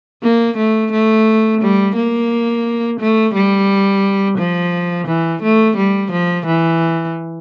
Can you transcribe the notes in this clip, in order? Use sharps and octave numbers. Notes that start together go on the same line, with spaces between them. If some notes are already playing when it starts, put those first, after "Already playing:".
A#3
A3
A3
G3
A#3
A3
G3
F3
E3
A3
G3
F3
E3